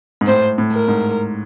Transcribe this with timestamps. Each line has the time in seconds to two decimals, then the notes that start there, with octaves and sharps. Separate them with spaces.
0.21 G#2
0.27 A2 C5
0.58 A2
0.73 A#4
0.88 G#2